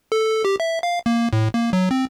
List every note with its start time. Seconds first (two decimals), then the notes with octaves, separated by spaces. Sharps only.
0.12 A4
0.45 G4
0.60 E5
0.83 F5
1.06 A#3
1.33 A2
1.54 A#3
1.73 F#3
1.91 C4